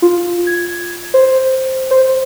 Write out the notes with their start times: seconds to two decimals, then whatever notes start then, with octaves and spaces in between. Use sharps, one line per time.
0.02 F4
0.47 G#6
1.14 C5
1.91 C5